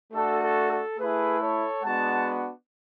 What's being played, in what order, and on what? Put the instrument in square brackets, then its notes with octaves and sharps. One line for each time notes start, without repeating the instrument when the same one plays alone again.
[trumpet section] A3 D4 F#4 A4
A4
A4
A3 E4 G#4 B4
A4 C#5
G#3 B3 D4 F#4 F#5 A5